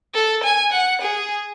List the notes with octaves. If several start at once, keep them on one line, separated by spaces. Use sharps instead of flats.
A4
G#5
F#5
G#4